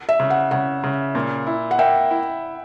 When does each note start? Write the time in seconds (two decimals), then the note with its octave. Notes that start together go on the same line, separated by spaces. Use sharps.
0.09 E5
0.20 C#3
0.30 F#5
0.51 C#3 F#5
0.84 C#3
1.15 A#2
1.47 E4
1.71 F#5
1.79 A#3 E5 G5
2.11 E4